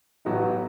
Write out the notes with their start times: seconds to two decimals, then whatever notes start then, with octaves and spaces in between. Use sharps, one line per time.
0.25 A1 A2 F#3 B3 D#4